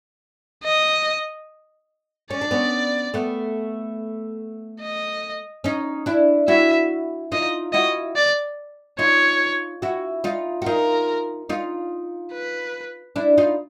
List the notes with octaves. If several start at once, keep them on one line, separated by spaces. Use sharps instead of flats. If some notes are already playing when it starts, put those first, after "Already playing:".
D#5
C#4 D5
D4
B3 C#4
A3 B3
D#5
C#4 D#4
D4 E4
E4 F#4 E5
D#4 F4 D#5
E4 F#4 D#5
D5
D#4 F4 C#5
E4 F#4
D#4 F4
F#4
D#4 F4 A#4
D#4 F4
B4
D4 E4
D#4 F4